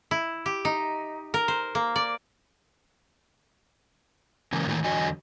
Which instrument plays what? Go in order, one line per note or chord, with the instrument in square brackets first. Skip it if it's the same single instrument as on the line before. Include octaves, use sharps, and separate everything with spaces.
[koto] E4
G4
D#4
A#4
C5
A#3
D5
[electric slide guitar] C#3 E3 A#3
A2 D#3 E3 A3 A#3
E2 D3 F#3 F#4 D#5 G#5